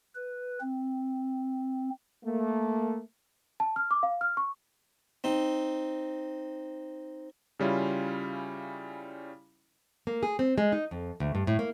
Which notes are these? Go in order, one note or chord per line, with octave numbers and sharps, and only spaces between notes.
B4
C4
A3 A#3
A5
F6
D6
F5
F6
C#6
C4 D#4
C#3 G3 C#4 E4 F4
A#3
G#4
C4
G#3
D#4
F2
D2
G2
A2
A#3